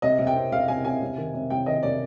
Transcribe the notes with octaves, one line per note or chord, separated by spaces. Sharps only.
C3 D#5
C3
G5
C4
C3 F5
C3 G#5
C3 G#5
C3
D#3
C3
C3 G5
D#3 D#5
C3 D5